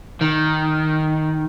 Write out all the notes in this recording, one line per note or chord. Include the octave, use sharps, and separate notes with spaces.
D#3